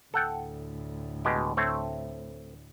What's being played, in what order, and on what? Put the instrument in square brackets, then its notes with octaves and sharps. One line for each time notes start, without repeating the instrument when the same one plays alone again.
[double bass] D2 A2 [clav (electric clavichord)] A4 F#5 G5
[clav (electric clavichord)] B2 G#3 G4
A3 C4 C#5